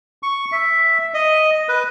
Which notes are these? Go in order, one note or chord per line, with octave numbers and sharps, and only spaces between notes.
C#6
E5
D#5
B4